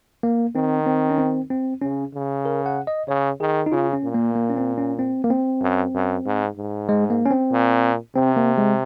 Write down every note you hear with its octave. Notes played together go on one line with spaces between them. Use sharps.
A#3
D#3 C4
C4
C#4
C4
C4
C#3 C#4
C#3
A#4
F#5
D#5
C#3 C#5
D#3 G#4
D#4
C#3 F4
C#4
A#2
A#3
A#3
C#4
C4
C#4
C4
A#3
C4
F#2
F#2
G#2
G#2
G#3
A#3
C#4
C4
A#2
C3 C4
A#3
G#3